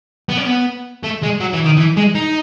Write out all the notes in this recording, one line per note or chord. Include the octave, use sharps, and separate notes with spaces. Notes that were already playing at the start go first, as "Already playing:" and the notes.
B3
C#4
B3
A3
G#3
F#3
E3
D#3
E3
G#3
D#4